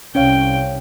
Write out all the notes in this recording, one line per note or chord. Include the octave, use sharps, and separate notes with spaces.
C2 C#4 C#5 F5 G5